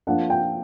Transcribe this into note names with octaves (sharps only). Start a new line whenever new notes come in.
F3 A#3 D4 F#5
G5